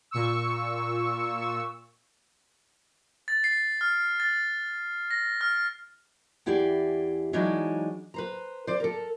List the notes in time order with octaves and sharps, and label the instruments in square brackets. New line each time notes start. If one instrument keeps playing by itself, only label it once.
[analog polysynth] A#2 C#6 E6
[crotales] A6
C7
F6
A6
A#6
F6
[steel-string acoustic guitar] E2 E4 G4 G#4 D5
E3 F#3 G#3 D4 D#4
B4 C5 A#5
C5 D5
A4 A#4